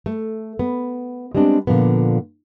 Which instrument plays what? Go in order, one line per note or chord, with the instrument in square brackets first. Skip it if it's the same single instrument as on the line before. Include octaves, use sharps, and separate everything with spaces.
[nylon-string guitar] A3
B3
G3 G#3 B3 C4 D4
A#2 D3 D#3 F3 B3